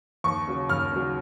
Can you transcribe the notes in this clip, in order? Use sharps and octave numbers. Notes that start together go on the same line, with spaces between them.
D#2 C#6
C#3 F#3
D#2 F6
C#3 F#3